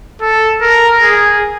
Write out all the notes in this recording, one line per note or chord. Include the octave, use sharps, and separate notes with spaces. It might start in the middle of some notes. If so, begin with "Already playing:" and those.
A4
A#4
G#4